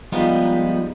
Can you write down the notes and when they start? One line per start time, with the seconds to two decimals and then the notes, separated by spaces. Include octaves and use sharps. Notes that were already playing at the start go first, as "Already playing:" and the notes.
0.12 F3 G3 G#3 B3 D#4 F4